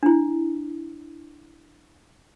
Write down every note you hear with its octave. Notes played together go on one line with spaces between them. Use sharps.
D4 E4